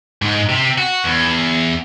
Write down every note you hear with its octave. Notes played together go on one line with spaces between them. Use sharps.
G#2
C3
F#4
E2